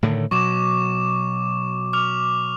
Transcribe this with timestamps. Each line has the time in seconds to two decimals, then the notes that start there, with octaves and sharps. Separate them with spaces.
0.03 A2 D3 D#3
0.31 B2 F#3 C#6 D6 E7
1.93 D6 F6 F7